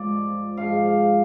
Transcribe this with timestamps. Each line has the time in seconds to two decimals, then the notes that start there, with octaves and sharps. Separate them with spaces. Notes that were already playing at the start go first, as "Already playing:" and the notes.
Already playing: G#2 F3 D5
0.57 G#2 F3 F5